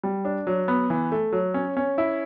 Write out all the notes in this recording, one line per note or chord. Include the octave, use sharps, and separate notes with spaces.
G3
D4
F#3
B3
E3
A3
F#3
C#4
C#4
E4